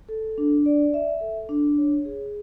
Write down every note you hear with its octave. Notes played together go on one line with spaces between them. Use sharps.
A4
D4
D5
E5
A4
D4
C#5
G#4